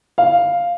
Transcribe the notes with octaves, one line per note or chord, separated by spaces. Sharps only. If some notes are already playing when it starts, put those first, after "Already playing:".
F5